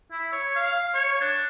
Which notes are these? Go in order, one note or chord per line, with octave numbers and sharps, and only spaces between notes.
E4
C#5
F5
C#5
D4